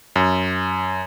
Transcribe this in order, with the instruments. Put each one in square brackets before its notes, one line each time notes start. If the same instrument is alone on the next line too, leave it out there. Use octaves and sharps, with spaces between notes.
[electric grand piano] F#2